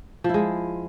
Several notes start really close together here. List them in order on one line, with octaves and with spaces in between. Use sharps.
F3 E4 G#3